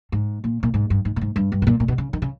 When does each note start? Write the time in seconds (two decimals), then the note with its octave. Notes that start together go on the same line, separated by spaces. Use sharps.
0.12 G#2
0.44 A#2
0.63 A#2
0.74 G#2
0.90 G2
1.05 G#2
1.16 A#2
1.21 G#2
1.36 G2
1.52 G2
1.62 B2
1.67 A#2
1.80 A#2
1.88 B2
1.98 C#3
2.13 D#3
2.22 C#3